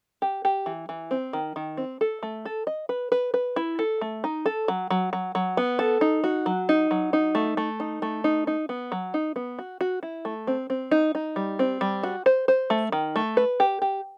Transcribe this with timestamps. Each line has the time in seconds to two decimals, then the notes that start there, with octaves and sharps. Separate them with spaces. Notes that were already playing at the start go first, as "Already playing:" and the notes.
0.22 G4
0.45 G4
0.66 E3
0.89 E3
1.11 C4
1.33 D#3
1.56 D#3
1.77 C4
2.01 A4
2.23 A3
2.45 A4
2.67 D#5
2.89 B4
3.12 B4
3.34 B4
3.56 E4
3.79 A4
4.01 A3
4.24 D#4
4.46 A4
4.68 F#3
4.90 F#3
5.13 F#3
5.35 F#3
5.57 B3
5.79 A4
6.01 D#4
6.24 F#4
6.46 F#3
6.69 D#4
6.91 F#3
7.13 D#4
7.35 A3
7.57 A3
7.80 D#4
8.02 A3
8.24 D#4
8.47 D#4
8.69 B3
8.92 F#3
9.14 D#4
9.36 B3
9.59 F#4
9.81 F#4
10.03 E4
10.25 A3
10.47 C4
10.70 C4
10.91 D#4
11.15 D#4
11.36 G3
11.59 C4
11.81 G3
12.03 F#4
12.26 C5
12.48 C5
12.70 A3
12.92 D#3
13.16 A3
13.37 B4
13.60 G4
13.82 G4